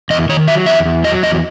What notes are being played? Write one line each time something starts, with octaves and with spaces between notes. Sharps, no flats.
E2 D#5
D#3 C#5
F#3 E5
E2 E5
E2
F#3 D#5
E2 D#5